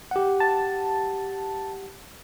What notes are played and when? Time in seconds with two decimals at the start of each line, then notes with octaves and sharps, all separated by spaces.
0.11 G4 F#5
0.40 A5